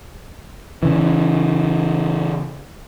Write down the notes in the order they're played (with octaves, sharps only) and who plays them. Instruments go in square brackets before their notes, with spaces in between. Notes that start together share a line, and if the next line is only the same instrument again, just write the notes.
[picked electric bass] C#3 E3